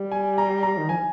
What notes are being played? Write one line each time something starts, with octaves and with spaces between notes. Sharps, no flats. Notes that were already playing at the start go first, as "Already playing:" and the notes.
Already playing: G3
G#5
A#5
A#5
D#3
F3 G#5